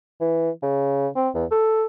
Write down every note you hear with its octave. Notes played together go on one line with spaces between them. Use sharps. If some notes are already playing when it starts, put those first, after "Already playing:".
E3
C#3
C4
E2
A4